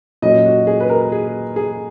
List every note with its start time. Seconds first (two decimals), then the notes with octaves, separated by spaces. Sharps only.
0.22 A#2 F#3 C#4 D#5
0.46 F#4
0.67 G#4
0.80 B4
0.89 A#4
1.12 G#4
1.56 G#4